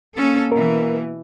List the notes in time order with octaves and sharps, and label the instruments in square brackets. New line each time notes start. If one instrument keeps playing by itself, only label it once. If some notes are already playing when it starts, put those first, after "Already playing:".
[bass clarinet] A#3 [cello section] C#4 A4
[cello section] B2 E3 [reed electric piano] A#4